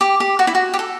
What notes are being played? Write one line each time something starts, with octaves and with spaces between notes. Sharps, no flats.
G4
G4
F#4
E4
F#4
G4
A4